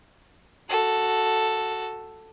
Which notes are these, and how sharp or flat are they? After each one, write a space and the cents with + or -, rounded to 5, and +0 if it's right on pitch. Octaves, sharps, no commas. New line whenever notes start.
F#4 +5 A4 +0